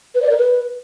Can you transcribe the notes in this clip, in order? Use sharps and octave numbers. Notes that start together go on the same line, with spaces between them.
B4
D5
A#4
B4